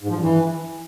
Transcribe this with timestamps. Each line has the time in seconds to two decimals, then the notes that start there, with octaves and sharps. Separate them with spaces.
0.03 G#2
0.09 F3
0.16 G2
0.22 E3